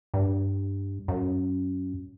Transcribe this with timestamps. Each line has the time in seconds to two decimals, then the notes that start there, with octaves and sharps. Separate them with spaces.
0.14 G2
1.08 F#2